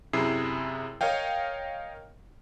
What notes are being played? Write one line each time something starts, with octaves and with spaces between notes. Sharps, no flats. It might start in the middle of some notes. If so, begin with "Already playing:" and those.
F#2 C3 E4 G#4 C7
A#4 C#5 D#5 F5 G5